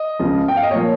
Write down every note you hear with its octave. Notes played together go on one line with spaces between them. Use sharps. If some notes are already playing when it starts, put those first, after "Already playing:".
Already playing: D#5
C#2 C#3 F3
G5
F5
D#5
A#2 F3 C#5